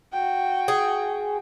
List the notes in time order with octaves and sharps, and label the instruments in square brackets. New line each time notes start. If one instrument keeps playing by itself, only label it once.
[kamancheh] F#4 G5
[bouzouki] G#4